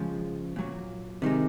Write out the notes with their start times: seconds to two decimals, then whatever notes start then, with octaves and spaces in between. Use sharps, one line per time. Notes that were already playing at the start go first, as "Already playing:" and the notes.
Already playing: C#3 F3 G#3
0.56 A#2 F#3
1.22 C3 D#3 G#3